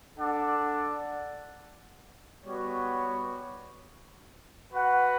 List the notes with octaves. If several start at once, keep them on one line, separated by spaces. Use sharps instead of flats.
D4 A4 D5 F#5
G3 B3 F#4 C#5
F#4 B4 F#5